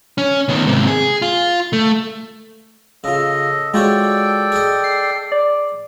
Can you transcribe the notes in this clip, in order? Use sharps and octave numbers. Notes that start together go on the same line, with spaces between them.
C#4
D#3 B3
G#2 C3
G#4
F4
A3
C#3 F4 A4 D#5
G#3 F4 F#4 A4 C#5 D5 G5
G#4 D#5
C7
D5